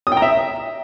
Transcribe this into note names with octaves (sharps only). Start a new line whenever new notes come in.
D#6
G5
A#5
E5